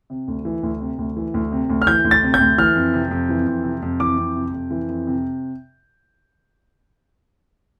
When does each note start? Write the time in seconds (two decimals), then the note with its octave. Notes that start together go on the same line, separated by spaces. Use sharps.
0.10 C3
0.28 D2
0.45 E3
0.63 D2
0.81 C3
0.99 D2
1.17 E3
1.34 D2
1.52 C3
1.70 D2
1.82 F6
1.87 E3 G6
2.05 D2
2.11 A6
2.23 C3
2.34 G6
2.40 D2
2.58 E3 F6
2.76 F2
2.93 C3
3.11 F2
3.29 E3
3.47 F2
3.64 C3
3.82 F2
4.00 E3 D6
4.18 F2
4.36 C3
4.53 F2
4.71 E3
4.89 F2
5.07 C3